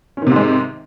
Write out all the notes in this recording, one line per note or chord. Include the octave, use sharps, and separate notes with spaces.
G#2 C3 D#3 G#3 C#4